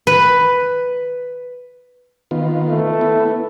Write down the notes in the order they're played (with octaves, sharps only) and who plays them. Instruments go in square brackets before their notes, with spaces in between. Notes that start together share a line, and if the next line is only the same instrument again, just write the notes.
[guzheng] B4
[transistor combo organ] D#3 B3 F4
[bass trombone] A3
[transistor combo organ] B3 E4